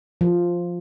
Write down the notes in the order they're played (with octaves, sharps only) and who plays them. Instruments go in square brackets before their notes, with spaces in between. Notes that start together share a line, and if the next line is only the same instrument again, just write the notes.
[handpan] F3